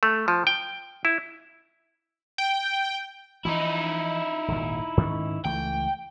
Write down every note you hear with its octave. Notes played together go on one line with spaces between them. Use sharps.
A3
F3
G5
E4
G5
E3 F3 D#4 E4
D#1 G#1 A#2
G#2 D#3 C#4
C#2 E3 A3 G5